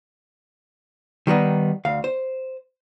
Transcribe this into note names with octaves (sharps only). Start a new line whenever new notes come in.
D#3 G3 B3 D#4
D2 F5
C5